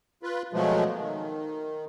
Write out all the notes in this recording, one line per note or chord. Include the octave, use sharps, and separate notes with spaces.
F4 B4
B2 F3 F#3 G#3 A3
D#3